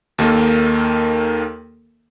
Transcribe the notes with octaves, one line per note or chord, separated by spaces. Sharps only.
D#2 D#3 A#3 A4 A#4